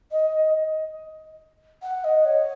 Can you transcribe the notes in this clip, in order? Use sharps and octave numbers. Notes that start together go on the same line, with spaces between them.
D#5
F#5
D#5
C#5